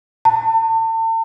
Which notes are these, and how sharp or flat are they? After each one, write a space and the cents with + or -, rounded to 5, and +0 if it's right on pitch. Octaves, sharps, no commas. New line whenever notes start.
A5 +40